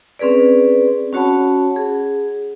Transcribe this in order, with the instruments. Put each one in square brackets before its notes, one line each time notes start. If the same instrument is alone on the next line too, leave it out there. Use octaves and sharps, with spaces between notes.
[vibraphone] C4 C#4 G#4 B4 D5
C#4 F#4 C#5 F#5 A5 B5
G#4